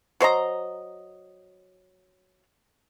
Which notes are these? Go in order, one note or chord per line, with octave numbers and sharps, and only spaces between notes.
F#3 C5 D#5 A#5